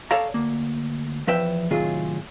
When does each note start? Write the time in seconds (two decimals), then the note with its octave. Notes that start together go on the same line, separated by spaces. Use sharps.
0.11 A4 C#5 D5 F5 A#5
0.34 D2 A#3
1.27 E2 F3 B4 E5 G5
1.70 A2 C3 D#3 F#3 F4 G#4